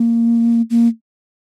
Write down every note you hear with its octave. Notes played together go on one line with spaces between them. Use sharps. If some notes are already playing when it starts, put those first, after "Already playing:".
Already playing: A#3
A#3